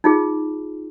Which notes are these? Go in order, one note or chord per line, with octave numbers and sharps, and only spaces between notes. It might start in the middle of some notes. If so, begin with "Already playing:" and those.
D#4 F4 G#4